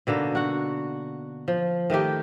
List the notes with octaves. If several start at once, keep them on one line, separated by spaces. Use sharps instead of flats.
B2 D3 A#3 D#4
F#4 F#5
F3
D#3 A3 D#4 G4